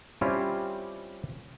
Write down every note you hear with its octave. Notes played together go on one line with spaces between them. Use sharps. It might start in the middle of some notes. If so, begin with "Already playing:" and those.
G3 C4 C#4 E4 F4 G4